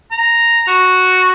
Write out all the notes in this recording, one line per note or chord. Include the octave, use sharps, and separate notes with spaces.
A#5
F#4